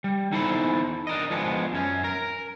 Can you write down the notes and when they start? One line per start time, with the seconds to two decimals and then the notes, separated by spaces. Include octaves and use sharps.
0.04 G3
0.32 E2 D#4 E4 A4 C5 B5
1.07 D4 A#4 D#5
1.30 F3 G#3 B3 D4
1.73 F#2 C#4
2.04 A#4 A#5